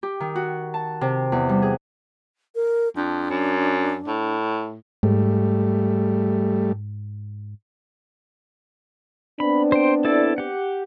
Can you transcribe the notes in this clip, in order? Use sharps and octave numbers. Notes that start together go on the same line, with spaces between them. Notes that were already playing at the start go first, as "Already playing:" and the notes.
G4
D#3
F#4
A5
C3
E2
G3
G#4
A#4
F2 D4
F#2
A2
G#2 G3 A3
B3 C4 D4 B5
C5 G5
E4 A4 D5
G4 F#5